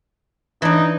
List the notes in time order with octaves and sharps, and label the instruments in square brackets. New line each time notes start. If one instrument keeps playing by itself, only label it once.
[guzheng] E3 D4 [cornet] D#4